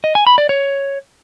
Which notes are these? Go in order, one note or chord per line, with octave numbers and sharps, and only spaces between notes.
D#5
G#5
B5
D5
C#5